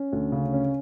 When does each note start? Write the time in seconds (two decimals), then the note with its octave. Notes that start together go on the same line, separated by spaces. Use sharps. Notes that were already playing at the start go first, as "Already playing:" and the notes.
Already playing: C#4
0.13 D2
0.32 C#3
0.53 C#4